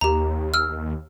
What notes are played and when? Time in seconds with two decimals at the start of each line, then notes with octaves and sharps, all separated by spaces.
0.01 D#2 G4 A#5
0.54 E6 F6